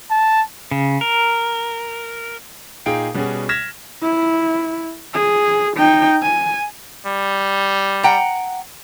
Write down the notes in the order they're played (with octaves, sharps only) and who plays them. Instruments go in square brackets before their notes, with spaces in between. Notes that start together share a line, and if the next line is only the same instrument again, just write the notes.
[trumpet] A5
[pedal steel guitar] C#3
A#4
[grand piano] A#2 D#4 G#4 F5 G5 D7
B2 G3 C#4 F#4 G#4
F6 G#6 A#6 B6 E7
[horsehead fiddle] E4
G#4
D#4 G5
G#5
[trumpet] G3
[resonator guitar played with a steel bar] F#5 G5 A#5